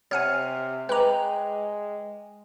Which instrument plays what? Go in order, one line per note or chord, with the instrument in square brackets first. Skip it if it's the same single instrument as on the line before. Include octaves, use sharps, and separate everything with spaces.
[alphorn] C3 [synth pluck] C#5 F#5 G#5 [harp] F6 C7
[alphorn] G#3 [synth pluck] B4 A#5 [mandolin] G5 G#5 D6